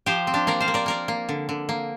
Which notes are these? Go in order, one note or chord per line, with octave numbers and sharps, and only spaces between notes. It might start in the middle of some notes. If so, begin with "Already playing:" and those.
F3 G4 C5
C4
D4 G4
A#3 A#4 D5
C5 F5
A#3
A#4 D5
A#3 A#4 D5
A#3
D3
D3
A#3